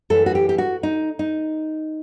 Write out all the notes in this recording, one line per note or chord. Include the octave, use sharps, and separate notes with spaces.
F#2 E3 A3 A4
F#4
G4
G4
F#4
D#4
D#4